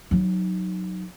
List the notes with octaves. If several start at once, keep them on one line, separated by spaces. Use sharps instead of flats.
F#3 D#4